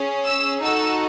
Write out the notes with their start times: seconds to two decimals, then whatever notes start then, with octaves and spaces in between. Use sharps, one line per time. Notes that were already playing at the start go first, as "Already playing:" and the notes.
Already playing: C#4 G#4
0.26 E6
0.62 D#4 F#4 A4 E6